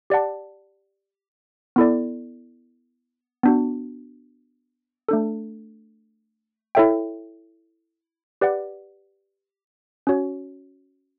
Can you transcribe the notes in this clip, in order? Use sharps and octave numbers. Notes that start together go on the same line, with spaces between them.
G4 D5 F#5 A5
B3 E4 A4 D5
B3 D4 F#4
A3 D4 A4
E4 A4 C#5 E5 G5
G4 B4 D5 F#5
C#4 F#4 C#5